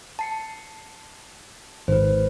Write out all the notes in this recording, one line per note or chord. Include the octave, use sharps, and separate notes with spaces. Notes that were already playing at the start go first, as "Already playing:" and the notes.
A5 C7 C#7
G#1 B4 C5